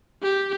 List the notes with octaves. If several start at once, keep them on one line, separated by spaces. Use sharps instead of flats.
G4